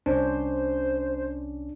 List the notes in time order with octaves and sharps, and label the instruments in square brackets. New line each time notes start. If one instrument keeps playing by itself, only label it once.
[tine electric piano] C2 C#4 D4 [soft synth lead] C5